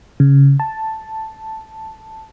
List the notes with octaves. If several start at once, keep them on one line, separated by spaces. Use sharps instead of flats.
C#3
A5